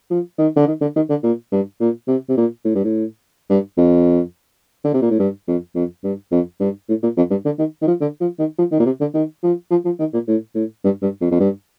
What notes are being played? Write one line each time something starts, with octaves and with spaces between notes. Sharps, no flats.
F3
D#3
D3
D#3
D3
D#3
D3
A#2
G2
A#2
C3
C3
A#2
A2
G2
A2
G2
F2
D3
C3
A#2
A2
G2
F2
F2
G2
F2
G2
A2
A#2
F2
G2
D3
D#3
D#3
F3
D3
F3
D#3
F3
D#3
A#2
C3
D3
D#3
F3
F3
F3
D#3
A#2
A2
A2
G2
G2
F2
F2
G2